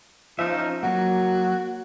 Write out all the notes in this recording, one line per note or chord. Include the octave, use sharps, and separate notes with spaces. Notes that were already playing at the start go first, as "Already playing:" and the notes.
F3 C#4 D#4 E5
F#3 A#3 F#4